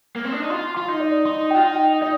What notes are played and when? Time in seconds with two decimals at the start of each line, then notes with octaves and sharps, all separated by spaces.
0.16 A#3
0.25 C4
0.32 D4
0.42 D#4
0.50 F4 C6
0.75 F4 C6
0.88 D#4
1.00 D5
1.25 D#4 C6
1.51 F4 G5
1.64 D#4
1.76 G5
2.02 D#4 D5